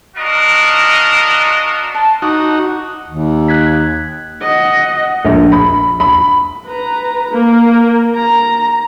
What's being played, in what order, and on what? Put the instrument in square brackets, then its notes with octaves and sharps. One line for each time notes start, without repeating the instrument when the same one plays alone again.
[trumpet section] D4 F4 F#4 A#4 D#5
[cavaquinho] A5 C6
[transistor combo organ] D#4 F#4 [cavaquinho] D6
[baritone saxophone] D#2
[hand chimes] F#6 G#6 B6
[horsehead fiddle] D#5 F#5
[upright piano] A#1
B5
B5
[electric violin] B4 A#5
A#3
A#5